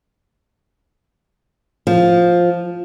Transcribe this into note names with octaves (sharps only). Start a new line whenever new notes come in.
F3